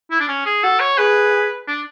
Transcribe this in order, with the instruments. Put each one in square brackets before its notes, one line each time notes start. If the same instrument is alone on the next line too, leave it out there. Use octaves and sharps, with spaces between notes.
[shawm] E4
D4
C#4
G#4
[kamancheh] F#4 [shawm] A4
[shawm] C#5
[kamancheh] G#4 [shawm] B4
[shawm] D4